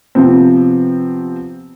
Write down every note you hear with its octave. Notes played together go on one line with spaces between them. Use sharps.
C3 F3 B3 C4